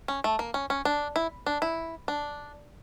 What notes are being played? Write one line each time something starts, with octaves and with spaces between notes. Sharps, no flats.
C#4
A3
A#3
C#4
C#4
D4
E4
D4
E4
D4